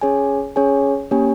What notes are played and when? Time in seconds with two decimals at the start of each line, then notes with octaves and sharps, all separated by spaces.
0.01 C#4 G#4 C#5 G#5
0.56 C#4 G#4 C#5 G#5
1.11 A#3 C#4 G4 C#5 G#5